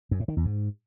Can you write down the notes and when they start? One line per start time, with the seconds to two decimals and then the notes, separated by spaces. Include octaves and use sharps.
0.11 F#2
0.20 A2
0.28 D#3
0.37 E2
0.45 G#2